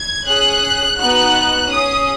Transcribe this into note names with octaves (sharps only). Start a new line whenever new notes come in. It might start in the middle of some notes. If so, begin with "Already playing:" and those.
Already playing: G#6
C#4 G#4 F#6
B3 D#4 F#4 F#6
C#4 G#4 D#6